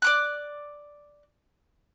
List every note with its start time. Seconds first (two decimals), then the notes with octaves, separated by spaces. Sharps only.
0.02 D5 D6 F#6